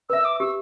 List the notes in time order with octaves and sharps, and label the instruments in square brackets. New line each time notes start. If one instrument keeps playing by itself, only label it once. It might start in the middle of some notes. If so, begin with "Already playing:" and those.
[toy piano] B4 E5 [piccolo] E6
[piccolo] D6
[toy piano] G4 [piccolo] E6